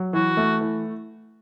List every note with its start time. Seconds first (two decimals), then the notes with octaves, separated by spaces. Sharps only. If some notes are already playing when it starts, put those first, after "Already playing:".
Already playing: F#3
0.13 E3 F#4
0.37 A3
0.61 E3